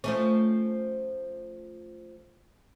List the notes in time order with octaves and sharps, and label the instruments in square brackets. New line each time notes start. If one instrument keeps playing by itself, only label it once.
[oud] F3 A3 C#4